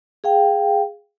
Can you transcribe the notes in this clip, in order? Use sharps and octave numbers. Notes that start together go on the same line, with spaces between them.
G#4 F5 G5